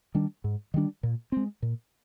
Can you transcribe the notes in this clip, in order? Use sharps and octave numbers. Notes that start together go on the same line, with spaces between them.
D#3 G3 D4
G#2
D#3 G3 D4
A#2
G#3 C4
A#2